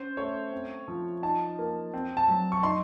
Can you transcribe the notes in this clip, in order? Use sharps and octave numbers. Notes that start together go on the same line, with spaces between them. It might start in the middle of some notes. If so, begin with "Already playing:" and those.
Already playing: C#4 C5
A3 C#5
C4
F3
D#4 A5
A#3
C4
A5
F#3
C#6
D#4 C6